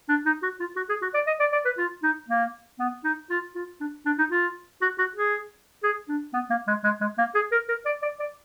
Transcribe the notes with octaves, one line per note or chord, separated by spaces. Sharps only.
D4
D#4
F#4
F4
F#4
G#4
F#4
D5
D#5
D5
D5
B4
F4
D#4
A#3
B3
D#4
F4
F4
D4
D4
D#4
F4
F#4
F#4
G#4
G#4
D4
B3
A#3
G#3
G#3
G#3
A#3
G#4
A#4
A#4
D5
D5
D5